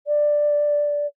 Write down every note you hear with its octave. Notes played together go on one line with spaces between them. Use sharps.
D5